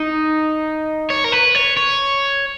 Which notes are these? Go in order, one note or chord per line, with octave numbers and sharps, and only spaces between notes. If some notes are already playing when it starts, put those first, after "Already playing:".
Already playing: D#4
C#5
A#4
B4
C#5
C#5